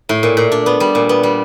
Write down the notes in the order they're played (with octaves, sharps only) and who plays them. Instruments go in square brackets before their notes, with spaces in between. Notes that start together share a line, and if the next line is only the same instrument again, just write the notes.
[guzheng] A2
A#2
A#2
D4
B3
G3
A#2
B3
G3